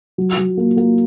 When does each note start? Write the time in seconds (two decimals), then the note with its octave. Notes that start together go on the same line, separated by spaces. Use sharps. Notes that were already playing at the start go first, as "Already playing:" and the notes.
0.18 F#3
0.37 F#3
0.57 A#3
0.77 A#3